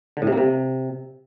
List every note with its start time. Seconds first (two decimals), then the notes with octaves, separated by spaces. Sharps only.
0.17 D3
0.22 A2
0.27 C3
0.32 A#3
0.37 C3